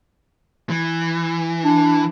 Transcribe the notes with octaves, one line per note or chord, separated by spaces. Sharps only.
E3
D4